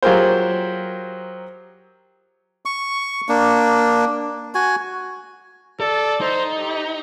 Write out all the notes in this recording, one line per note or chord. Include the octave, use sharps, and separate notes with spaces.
F#3 F4 G4 G#4 A#4 C5
C#6
A#3 D4
F#4 G#5
A4 D5
D#4 C5
G4